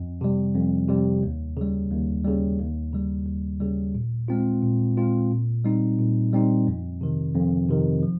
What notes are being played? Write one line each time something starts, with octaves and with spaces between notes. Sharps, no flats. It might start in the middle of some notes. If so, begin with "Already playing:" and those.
Already playing: F2
C3 G3
F2
C3 G3
D#2
C#3 G3
D#2
C#3 G3
D#2
C#3 G3
D#2
C#3 G3
A#2
G#3 C4 F4
A#2
G#3 C4 F4
A#2
G3 C4 D#4
A#2
G3 C4 D#4
F2
C3 D#3
F2
C3 D#3
F3